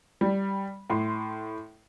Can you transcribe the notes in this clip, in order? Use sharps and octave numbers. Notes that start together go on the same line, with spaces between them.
G3
A2 C6